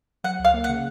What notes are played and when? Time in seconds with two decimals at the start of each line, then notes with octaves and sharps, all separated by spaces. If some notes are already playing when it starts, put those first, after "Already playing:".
0.24 F#3 F#5
0.39 C#2
0.45 F5
0.54 A#3
0.64 F#5
0.69 C#3